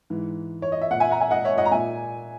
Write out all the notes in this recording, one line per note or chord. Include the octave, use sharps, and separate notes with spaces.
G#2 E3
C#5
D#5
E5
A#2 F#5
E5 G#5
F#5 A#5
E5 G#5
D#5 F#5
C#5 E5
D#5 F#5
A#5
A#2 E5 G#5